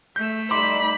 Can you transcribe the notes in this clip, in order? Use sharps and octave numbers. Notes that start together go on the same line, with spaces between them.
A3 E6 G6
G3 D#4 D5 B5 C6 D6